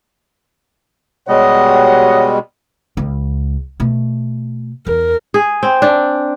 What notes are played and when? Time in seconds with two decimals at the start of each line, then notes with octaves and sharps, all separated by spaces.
1.28 B2 G3 G#3 F#4 G4 C#5 D#5 F#5
2.97 C#2
3.80 B2 A3
4.87 E2 A#4
5.34 G#4
5.63 C4
5.82 D4